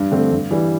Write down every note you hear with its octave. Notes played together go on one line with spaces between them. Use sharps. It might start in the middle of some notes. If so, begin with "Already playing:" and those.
Already playing: G2
D3 A3 C4
G2
E3 G3